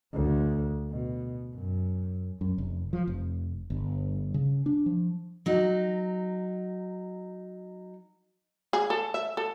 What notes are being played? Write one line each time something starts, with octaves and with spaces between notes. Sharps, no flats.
D2
B2
F#2
F#2
F1
F3
F1
G1
C#3
D4
F3
F#3 D#4
G#4
A4
E5
A4